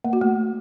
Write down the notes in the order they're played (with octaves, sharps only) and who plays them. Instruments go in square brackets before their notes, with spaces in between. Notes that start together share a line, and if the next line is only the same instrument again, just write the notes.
[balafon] A#3
F#4
A3